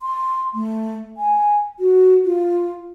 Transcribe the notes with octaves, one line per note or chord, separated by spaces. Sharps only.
C6
A3
G#5
F#4
F4